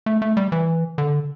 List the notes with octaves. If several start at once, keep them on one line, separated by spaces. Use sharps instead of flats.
A3
A3
G3
E3
D3